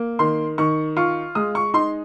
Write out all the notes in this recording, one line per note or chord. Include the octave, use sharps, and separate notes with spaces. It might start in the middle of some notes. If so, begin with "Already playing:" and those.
Already playing: A#3
D#3 C6
D#3 C#6
F4 C#6
G#3 D#6
C#6
D#4 C6